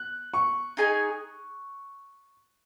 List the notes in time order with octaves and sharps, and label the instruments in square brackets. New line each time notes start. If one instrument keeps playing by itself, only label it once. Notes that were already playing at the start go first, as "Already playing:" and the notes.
Already playing: [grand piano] F#6
C#6
[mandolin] D#4 G#4 D#5 G#5